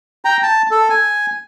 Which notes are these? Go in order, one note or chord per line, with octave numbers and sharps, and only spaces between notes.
G5 A#5
A5
A4
G#5